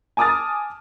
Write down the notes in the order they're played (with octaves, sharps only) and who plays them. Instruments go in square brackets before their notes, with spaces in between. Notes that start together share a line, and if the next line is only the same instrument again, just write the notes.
[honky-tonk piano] G#5 A5 D6 D#6 F6 A6